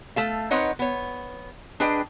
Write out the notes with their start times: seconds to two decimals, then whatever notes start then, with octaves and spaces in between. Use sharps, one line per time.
0.16 A3 A4 F5
0.51 C4 D#4 B4 C#5 D#5 F#5
0.79 B3 C#5
1.80 D4 G#4 B4 D#5 G5